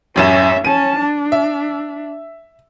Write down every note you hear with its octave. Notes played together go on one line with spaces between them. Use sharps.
A1 F#2 C#4 E5 E7
C#4 A5 D#7
D4
E5